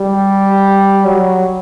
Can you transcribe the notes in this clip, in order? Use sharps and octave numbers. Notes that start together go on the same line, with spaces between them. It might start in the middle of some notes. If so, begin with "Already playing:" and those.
Already playing: G3
F#3